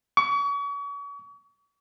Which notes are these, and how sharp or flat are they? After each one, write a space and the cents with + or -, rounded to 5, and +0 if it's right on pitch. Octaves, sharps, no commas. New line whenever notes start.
C#6 +40